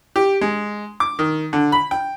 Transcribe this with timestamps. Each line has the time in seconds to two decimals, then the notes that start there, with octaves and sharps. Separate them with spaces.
0.16 G4
0.41 G#3
1.00 D6
1.19 D#3
1.53 D3
1.72 B5
1.91 G5